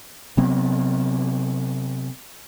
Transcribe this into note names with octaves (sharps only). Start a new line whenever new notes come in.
C3 F#3 B3 C4